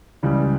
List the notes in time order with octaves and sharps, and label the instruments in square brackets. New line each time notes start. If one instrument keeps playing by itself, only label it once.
[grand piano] C#2 C#3 E3 G3